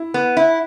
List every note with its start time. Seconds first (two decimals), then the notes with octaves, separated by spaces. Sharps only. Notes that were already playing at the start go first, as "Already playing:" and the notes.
Already playing: E4
0.14 B3
0.37 E4